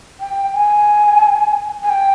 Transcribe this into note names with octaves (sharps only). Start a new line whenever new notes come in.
G5
G#5
G#5
G5